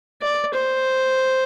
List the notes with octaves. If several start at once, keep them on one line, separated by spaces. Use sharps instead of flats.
D5
C5